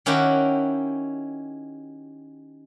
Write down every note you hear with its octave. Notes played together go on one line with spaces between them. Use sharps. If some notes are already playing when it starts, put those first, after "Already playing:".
D#3 C#4 E4 F#4 G4